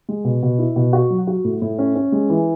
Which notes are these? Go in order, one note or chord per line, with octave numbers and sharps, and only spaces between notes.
G#3
B2
B2
E4
B2
F#4
F#3
F#4
A2
A2
C#4
C#4
G#3
E3